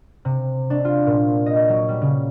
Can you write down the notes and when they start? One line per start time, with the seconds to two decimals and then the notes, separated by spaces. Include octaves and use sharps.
0.25 C3
0.70 D4
0.85 F4
1.07 A#2
1.46 D#5
1.69 F#3
1.88 G3
2.02 C#3